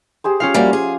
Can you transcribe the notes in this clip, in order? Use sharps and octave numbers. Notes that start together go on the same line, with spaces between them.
G4 G#4 C5
C#4 F4 F5 G5
F3 G3 A#3 F#4 G#5
G#4